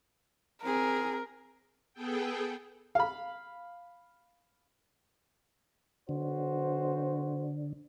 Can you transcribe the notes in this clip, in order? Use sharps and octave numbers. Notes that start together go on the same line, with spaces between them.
C4 G#4 A#4
B3 G#4 A4 G5
F5 B5
B1 D3 F#4 C5